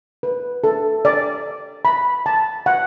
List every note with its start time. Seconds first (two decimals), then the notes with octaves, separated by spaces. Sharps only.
0.23 B4
0.64 A4
1.05 D5
1.85 B5
2.26 A5
2.66 F#5